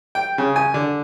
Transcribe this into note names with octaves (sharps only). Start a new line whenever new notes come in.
G5
C#3
G#5
D3